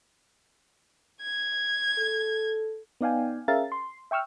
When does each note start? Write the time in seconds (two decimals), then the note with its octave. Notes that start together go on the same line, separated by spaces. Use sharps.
1.22 G#6
1.98 A4
3.01 B3 D#4 D5 F5 G5 G#5
3.48 C#4 G#4 A#4 E5 F5 A6
3.72 C6
4.11 E5 G5 C#6 E6 F6